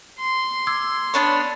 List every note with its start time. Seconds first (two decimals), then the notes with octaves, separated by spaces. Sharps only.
0.20 C6
0.67 D6 E6 G#6
1.14 B3 D4 C#5 B5